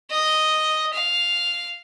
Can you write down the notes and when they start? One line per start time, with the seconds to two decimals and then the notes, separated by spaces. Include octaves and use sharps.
0.10 D#5
0.93 F5